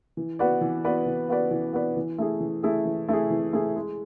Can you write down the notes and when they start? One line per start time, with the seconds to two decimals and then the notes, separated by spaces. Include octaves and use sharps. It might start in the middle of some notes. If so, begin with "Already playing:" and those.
0.17 E3
0.39 B3 F#4 B4 D5
0.61 E3
0.85 B3 F#4 B4 D5
1.06 E3
1.29 B3 F#4 B4 D5
1.51 E3
1.73 B3 F#4 B4 D5
1.96 E3
2.18 A3 E4 G#4
2.40 E3
2.63 A3 E4 G#4
2.86 E3
3.08 A3 E4 G#4
3.30 E3
3.53 A3 E4 G#4
3.76 G#3